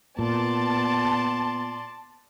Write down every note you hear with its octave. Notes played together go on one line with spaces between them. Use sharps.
A#2 B3 D5 A5 C6